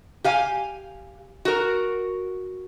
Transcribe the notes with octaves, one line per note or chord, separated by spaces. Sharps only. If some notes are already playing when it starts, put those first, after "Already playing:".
G4 F5 G#5
F#4 A#4